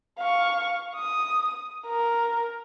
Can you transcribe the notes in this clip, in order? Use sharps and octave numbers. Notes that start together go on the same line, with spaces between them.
F5 C#6
D#6
A#4